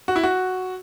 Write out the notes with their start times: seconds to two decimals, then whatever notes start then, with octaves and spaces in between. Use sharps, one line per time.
0.08 F#4
0.16 E4
0.23 F#4